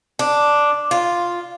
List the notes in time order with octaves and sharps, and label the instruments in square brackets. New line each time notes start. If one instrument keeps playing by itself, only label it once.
[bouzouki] D4
F4